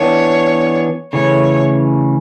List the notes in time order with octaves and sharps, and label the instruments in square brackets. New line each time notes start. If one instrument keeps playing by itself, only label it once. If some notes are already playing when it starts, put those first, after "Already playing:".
Already playing: [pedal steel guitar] E3 B3 D4 G4 [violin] C#5
[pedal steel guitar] C#3 E3 A3 C#4 [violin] C#5